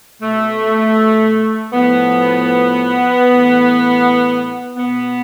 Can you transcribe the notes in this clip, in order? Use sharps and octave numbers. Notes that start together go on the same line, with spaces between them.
B2 A3
A2 F3 B3
A2 E3
B2 B3